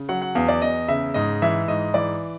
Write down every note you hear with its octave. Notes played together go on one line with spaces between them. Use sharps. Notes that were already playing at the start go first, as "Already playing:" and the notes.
Already playing: C#3
F#3 F#5
F#5
E2 F5
D5
E2 D#5
C#3 E5
G#2 D#5
E3 E5
G#2 D#5
E3 D5